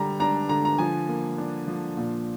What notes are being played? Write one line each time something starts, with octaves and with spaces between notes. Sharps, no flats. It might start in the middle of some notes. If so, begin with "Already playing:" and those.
Already playing: D3 G3 A#5
D4 A#5
D3 A#5
A#5
F3 G#5
A#3
D4
F3
A#2